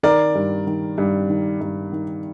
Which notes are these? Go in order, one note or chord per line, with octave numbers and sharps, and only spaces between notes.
D#3 A#4 D5
G2
D#3
G2
D#3
G2
D#3